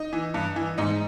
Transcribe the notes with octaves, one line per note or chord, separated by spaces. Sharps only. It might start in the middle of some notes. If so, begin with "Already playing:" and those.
Already playing: D#4
E3
G2
E3
G#2 D#4